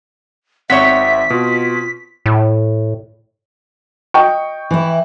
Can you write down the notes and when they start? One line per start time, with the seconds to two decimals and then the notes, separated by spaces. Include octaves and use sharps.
0.70 G#1 C4 C#5 E5 F#5 B6
1.30 B2 F4
2.26 A2
4.14 D#5 G5 C#6
4.71 E3 E4